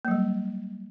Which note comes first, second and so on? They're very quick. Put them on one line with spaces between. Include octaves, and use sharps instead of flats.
A#3 F#3 G3